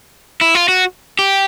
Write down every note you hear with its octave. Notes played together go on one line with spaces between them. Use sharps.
E4
F4
F#4
G4